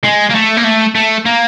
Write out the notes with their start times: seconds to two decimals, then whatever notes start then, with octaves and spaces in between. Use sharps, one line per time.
0.04 G#3
0.30 A#3
0.35 A3
0.57 A#3
0.64 A3
0.95 A3
1.25 A#3